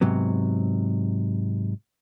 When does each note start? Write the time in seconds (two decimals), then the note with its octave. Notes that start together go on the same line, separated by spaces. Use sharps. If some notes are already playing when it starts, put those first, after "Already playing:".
0.01 G#2 C3 F#3 B3